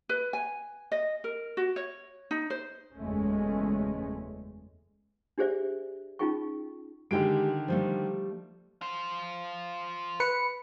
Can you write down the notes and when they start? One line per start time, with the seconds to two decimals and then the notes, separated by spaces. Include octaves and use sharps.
0.09 B4
0.33 G#5
0.92 D#5
1.24 A#4
1.57 F#4
1.76 C#5
2.31 D#4
2.50 C5
2.97 F#1 E2 G#3 A3 C#4
5.38 D4 G4 G#4 C5 D5 E5
6.19 C#4 D#4 F4 G#4 G5 C#6
7.11 D3 D#3 G#3 G4 G5 D7
7.68 F3 G3 A3
8.82 F4 C5
10.20 B4 C#7